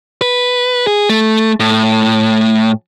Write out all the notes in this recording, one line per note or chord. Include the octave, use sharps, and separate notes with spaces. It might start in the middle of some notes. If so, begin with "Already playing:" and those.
B4
G#4
A3
A2